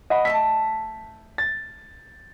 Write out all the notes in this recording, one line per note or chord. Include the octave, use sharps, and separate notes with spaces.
D#5 F#5 B5
A3 D#5 A5 B6
A6